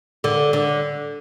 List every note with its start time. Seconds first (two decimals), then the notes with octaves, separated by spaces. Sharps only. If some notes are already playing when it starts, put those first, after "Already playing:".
0.24 D3
0.53 D3